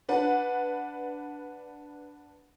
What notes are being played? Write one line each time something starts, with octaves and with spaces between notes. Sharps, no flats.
D4 B4 F#5